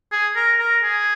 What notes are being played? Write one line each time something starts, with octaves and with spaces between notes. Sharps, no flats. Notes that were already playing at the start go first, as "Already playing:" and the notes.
G#4
A#4
A#4
G#4